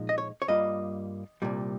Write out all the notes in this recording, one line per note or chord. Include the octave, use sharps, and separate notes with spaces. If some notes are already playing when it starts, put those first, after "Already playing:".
Already playing: A#2 F3 G#3 D#4
D#5
C#5
C#5
G2 G3 A#3 F4 D#5
C2 A#2 G3